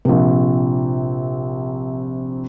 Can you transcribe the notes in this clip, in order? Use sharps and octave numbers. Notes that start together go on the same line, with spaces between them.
A#1 C3